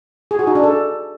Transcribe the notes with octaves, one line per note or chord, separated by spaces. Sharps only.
G#4
F#4
D#4
D4
A4